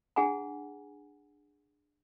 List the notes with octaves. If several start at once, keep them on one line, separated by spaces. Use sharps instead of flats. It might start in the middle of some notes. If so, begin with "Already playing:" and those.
D4 G#4 F#5 G#5 A#5